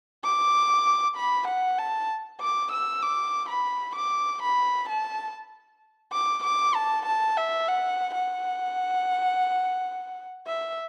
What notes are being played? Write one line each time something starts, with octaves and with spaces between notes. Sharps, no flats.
D6
B5
F#5
A5
D6
E6
D6
B5
D6
B5
A5
D6
D6
A5
A5
E5
F#5
F#5
E5